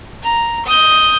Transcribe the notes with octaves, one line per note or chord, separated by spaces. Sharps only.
A#5
D#6 G6